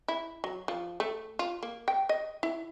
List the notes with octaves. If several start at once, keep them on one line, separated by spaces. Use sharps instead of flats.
E4
F#3
F3
A3
F4
A#3
G5
D#5
E4